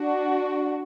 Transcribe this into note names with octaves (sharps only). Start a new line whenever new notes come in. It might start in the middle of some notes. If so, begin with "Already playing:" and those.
Already playing: D4 F#4